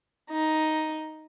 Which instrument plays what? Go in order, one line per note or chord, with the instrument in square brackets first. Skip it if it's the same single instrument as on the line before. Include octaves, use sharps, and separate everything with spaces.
[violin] D#4